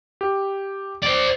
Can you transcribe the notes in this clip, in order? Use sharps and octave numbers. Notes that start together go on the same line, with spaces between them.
G4
C5 D5